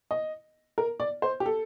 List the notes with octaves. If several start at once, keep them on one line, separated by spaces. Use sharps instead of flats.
D#5
A#4
D5
C5
G4
A4